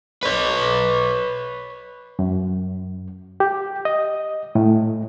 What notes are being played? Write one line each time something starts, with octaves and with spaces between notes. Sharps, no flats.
B4 C#5
F#2
G4
D#5
A2